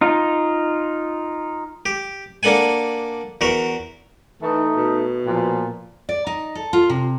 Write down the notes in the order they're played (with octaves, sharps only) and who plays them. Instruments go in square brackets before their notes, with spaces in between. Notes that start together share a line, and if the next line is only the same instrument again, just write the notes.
[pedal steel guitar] D#4 F4
[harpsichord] G4
A#3 D4 A4 F#5 G#5
E2 F#4 A#4
[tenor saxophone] E3 [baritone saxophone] A3 [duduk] D#4
[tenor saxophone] B2
[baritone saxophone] A#2 [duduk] F3
[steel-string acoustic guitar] D5
D#4
A4
F4
C3